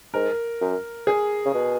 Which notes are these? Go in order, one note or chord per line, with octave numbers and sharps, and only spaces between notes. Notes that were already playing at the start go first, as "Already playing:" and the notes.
G#2 A#4
F#2
G#4
C#3
B2